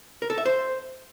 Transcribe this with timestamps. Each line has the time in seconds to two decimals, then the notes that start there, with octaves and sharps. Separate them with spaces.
0.22 A#4
0.30 A4
0.38 E5
0.46 C5